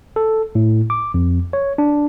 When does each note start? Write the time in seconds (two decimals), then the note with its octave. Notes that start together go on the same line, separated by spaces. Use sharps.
0.16 A4
0.55 A2
0.90 D6
1.14 F2
1.53 C#5
1.78 D4